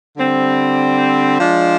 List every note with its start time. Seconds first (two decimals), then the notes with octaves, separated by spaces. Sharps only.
0.17 D3 G3 C4
1.40 F3 G#3 D4